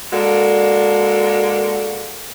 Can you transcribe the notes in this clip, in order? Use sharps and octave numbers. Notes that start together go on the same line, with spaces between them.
G#3 A#3 D4 F#4 A4